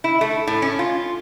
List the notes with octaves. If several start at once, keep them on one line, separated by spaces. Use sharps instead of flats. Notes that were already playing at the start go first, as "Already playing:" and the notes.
E4
A3
A2
C#4
F4